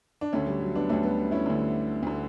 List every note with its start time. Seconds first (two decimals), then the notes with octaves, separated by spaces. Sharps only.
0.21 D4
0.33 D2 D3 A3 C#4
0.47 G3
0.61 F#3
0.75 B3 D4
0.89 D2 D3 A3 C#4
1.03 G3 B3
1.31 C#4 E4
1.46 D2 D3
2.03 D2 D3